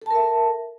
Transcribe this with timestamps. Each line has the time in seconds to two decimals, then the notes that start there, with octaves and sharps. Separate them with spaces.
0.02 A4
0.06 A5
0.11 A#4
0.15 E5